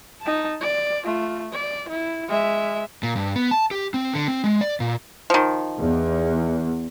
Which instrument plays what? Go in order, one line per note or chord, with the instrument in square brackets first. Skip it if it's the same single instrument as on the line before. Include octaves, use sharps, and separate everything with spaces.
[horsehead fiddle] D#4 A5
D5
A3 F4
D5
E4
G#3 E5
[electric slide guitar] A#2
G2
B3
A5
G4
C4
D3
C4
G#3
D5
A#2
[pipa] D#3 F3
[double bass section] E2